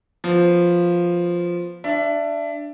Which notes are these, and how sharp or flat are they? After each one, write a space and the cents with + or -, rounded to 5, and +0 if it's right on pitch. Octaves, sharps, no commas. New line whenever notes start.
F3 +0 B3 +0
D4 +0 E5 +25